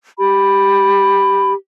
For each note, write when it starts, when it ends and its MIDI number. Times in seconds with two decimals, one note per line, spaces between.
0.19 1.54 67
0.19 1.54 83